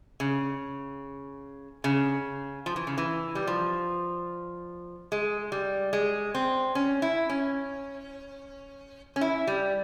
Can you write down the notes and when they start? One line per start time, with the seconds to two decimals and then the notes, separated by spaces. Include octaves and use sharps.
0.20 C#3
1.84 C#3
2.66 F3
2.76 E3
2.87 C#3
2.98 E3
3.35 G3
3.47 F3
5.12 G#3
5.52 G3
5.93 G#3
6.35 C4
6.75 C#4
7.02 E4
7.29 C#4
9.16 C#4
9.21 E4
9.47 G3